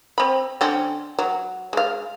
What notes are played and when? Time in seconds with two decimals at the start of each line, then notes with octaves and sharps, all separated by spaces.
0.18 C4 B5
0.61 D3 C4 C#4
1.19 F#3
1.73 G#3 F5